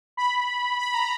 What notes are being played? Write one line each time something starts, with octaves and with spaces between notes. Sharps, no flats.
B5
B5
A#5